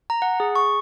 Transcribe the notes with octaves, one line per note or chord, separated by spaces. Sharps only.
A#5
F#5
G#4
C#6